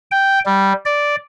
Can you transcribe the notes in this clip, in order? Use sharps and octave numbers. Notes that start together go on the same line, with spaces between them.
G5
G3
D5